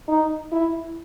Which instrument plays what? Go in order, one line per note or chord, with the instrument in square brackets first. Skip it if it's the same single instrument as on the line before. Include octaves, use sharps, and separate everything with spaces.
[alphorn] D#4
E4